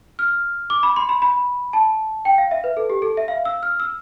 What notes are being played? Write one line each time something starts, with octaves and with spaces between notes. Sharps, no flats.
F6
D6
B5
C6
B5
B5
A5
G5
F5
E5
B4
A4
G4
A4
E5
F5
E6
F6
E6